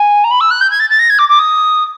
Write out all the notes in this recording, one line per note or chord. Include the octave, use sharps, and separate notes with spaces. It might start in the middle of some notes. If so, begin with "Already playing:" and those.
Already playing: G#5
A#5
B5
E6
F#6
G6
G#6
A6
A6
A#6
G#6
D6
D6
D#6